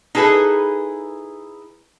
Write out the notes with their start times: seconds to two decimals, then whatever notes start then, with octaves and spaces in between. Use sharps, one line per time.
0.15 D#4 E4 G#4 A4 B4